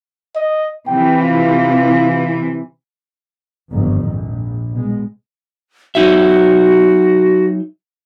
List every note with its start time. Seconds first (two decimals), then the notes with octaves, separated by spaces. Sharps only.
0.36 D#5
0.87 C3 E3 G5
1.23 F4
3.71 G1 F2 G#2 D#3
4.04 A#1
4.73 B2 G#3
5.95 F#3 D#4 F#4 E5